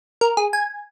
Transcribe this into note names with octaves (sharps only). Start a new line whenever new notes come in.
A#4
G#4
G#5